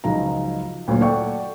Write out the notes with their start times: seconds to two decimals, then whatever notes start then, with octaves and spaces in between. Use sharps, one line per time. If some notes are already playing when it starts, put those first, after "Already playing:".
0.04 C#2 F3 F#3 D#4 A#5
0.88 D2 A#2 F#3 C#5
1.01 A4 D5 F#5 G5 C#6